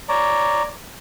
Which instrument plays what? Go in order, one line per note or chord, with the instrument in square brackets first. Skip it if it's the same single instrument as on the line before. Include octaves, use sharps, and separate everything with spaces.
[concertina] C#5 D5 A#5